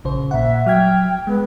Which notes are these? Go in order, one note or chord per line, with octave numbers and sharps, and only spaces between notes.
A#1 C#3 C5
A#2 E5 F#5
F#3 G5 F6 G#6
G#3 B3